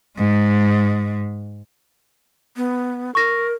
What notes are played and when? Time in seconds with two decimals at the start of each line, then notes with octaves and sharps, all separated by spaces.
0.17 G#2 G#3
2.57 B3
3.15 A#4 C#6 A#6